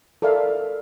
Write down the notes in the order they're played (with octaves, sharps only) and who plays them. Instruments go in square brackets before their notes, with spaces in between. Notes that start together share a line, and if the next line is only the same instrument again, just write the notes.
[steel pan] A4 A#4 D5 E5 F5